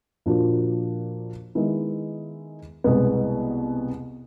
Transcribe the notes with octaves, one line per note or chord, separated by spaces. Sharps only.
A#2 F3 A#3 D4 F#4
D#3 G#3 B3 E4
C2 B2 G#3 B3